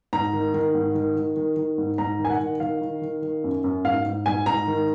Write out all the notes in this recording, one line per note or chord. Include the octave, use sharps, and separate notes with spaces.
G#2 A#5
D#3
D#3
G#2
D#3
D#3
D#3
D#3
G#2
G#2 A#5
D#3
G#5
F#5
D#3
D#3 F5
D#3
D#3
D#3
F#2
F#2
G#2 F5
G#2
G#2 G#5
G#2 A#5
D#3